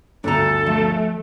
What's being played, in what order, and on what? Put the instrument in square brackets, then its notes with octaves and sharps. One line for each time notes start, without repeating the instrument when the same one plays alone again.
[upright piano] G1 D2 [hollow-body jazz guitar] D4 A#5 [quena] A4
[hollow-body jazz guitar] F3 [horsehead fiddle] A3